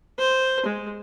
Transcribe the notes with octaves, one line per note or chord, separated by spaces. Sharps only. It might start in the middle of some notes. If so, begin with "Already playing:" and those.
C5
G#3